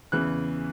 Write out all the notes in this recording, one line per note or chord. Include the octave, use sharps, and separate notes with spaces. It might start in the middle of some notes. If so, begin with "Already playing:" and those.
E2 C#3 E3 F#6